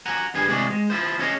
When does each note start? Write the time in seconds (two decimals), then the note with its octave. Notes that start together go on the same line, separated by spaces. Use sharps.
0.06 F#5 G#5 A#5
0.34 G2 B3 G#4 G#5
0.48 A2 C3 G#3 F#4 G#4 D5
0.70 G#3
0.90 E4 F4 C5
1.19 C#4 F#4 G#4 C#5 D#5 F5